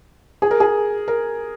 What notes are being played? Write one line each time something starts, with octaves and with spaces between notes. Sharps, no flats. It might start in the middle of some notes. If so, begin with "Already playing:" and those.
G#4
A#4
G#4
A#4